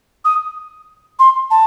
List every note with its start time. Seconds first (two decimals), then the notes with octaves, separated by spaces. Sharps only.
0.25 D#6
1.19 C6
1.51 A5